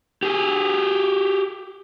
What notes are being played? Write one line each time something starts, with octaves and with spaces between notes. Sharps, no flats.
G4 G#4